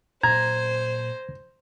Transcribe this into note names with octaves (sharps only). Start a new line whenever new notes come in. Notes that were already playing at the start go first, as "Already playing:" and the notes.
A#2 F#3 C5 A#5 G#6